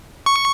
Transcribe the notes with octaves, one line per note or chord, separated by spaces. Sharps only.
C#6